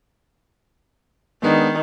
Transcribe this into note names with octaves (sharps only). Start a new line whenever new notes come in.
D#3 G#3 B3 D4